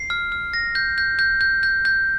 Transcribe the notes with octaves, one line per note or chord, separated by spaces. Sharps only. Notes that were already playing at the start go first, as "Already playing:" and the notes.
Already playing: C7
F6
F6
A#6
G6
G6
G6
G6
G6
G6